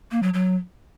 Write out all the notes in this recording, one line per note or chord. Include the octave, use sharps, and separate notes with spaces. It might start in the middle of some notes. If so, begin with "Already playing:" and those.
A#3
F#3
F#3